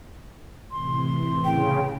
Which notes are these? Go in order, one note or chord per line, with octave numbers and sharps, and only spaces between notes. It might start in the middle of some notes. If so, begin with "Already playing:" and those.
A2 C3 E3 C6
C#3 G5